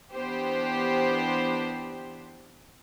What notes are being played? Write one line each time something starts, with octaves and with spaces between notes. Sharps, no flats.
E3 B3 D4 G4 C5